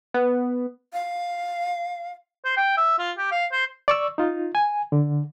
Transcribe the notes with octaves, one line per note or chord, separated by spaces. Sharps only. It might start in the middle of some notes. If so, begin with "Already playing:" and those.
B3
F5
C5
G5
E5
F4
G4
F5
C5
D5 C#6 E6
D#4 F4
G#5
D3